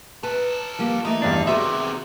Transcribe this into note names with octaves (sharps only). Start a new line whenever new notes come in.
C#4 A4 B4 A5
F3 G3 A#3
E3 A3 A#3 D#4
E2 G2 D4
C3 D#3 B3 F#4 G#4 E5